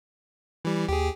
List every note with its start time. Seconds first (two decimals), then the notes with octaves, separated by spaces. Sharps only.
0.65 E3 G3
0.89 D#2 G4 G#4